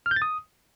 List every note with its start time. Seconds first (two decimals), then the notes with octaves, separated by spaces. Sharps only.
0.06 F6
0.11 G6
0.16 A6
0.22 D#6